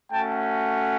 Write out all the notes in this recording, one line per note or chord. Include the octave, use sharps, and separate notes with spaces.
A3 C#4 F#4 G5 A5